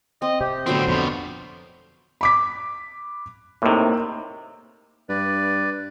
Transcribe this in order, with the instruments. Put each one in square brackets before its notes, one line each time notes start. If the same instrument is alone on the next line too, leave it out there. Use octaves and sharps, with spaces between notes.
[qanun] C4 [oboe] D#5
[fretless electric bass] C3 [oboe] G4
[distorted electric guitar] A2 C4 [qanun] D3 F#3 B3 [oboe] C5
[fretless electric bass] F2 [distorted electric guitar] B2 F4
[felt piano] B5 D6 B6
[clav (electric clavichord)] A2 C3 [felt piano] A#3 D#4
[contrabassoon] G2 [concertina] B4 D5